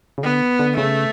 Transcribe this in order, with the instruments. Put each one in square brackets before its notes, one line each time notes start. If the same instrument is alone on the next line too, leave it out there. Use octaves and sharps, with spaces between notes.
[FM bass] C#3
[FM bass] D3 [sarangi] B3
[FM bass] D3
[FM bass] C#3 [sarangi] A3